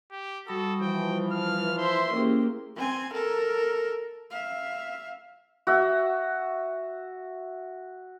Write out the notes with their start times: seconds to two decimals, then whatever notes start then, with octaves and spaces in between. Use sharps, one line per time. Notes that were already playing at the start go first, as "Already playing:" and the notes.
0.11 G4
0.47 G3 F#4 A4 B5 D#6
0.81 E3 F3 G5
1.31 F5 F6
1.78 C5 E5 C6
2.12 A#3 C#4 E4 G4 G#4
2.76 C4 G#5
3.13 A4 A#4
4.30 E5 F5
5.67 F#4 E5